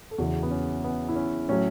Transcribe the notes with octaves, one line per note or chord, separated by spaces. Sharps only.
A4
E2 C#3 E3 F#4
B3
C#4
B3
E4
C#4
A2 F#3 C#4